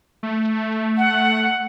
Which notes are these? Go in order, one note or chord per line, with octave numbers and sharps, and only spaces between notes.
A3
F#5